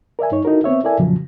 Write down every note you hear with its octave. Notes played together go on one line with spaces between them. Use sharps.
A#4 D5 E5 G#5
G2 D#4 C#5
D#4 E4 F#4 A4 A#4
B3 C4 C#5 E5
E4 A4 A#4 D5 E5 G#5
F2 A#2 C#3 F3 F#3